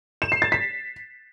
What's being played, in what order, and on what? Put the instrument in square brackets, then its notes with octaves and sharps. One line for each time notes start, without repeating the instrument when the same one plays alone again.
[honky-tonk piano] E7
C7
A6
B6